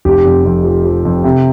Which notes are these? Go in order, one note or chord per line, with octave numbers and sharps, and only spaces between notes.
F1 G4
F2
F2
F3
F3
F2
C3